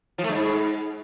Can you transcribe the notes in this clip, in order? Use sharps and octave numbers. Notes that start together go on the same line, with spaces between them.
F3
A3
G2
G#2